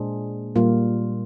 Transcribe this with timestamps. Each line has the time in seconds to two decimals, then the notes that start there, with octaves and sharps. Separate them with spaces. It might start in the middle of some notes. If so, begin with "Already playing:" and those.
Already playing: A#2 G#3 D4 G#4 C5
0.56 A#2 G3 A#3 F4